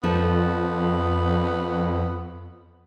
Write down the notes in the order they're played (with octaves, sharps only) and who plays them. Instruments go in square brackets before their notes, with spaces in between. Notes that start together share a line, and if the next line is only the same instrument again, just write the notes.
[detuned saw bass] F2 [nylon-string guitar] F3 A4 [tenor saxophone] B3